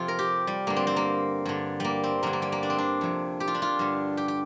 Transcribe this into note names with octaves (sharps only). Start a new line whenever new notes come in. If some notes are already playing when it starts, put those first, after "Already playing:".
Already playing: F2 C3 F4
A#4
G4
G3
G2 D3 A#3
C4
C4
A#3
G2 D3
G3 A#3
C4
G2 D3 A#3
A#3
G3
A#3
D4
C4
D4
F2 C3
G4
F4
D4
F4
G2 D3
G4
G4